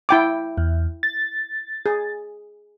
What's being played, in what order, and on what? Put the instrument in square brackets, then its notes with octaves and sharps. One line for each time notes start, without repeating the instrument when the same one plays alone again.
[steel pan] E4 G5 D6
[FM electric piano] E2
A6
[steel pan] G#4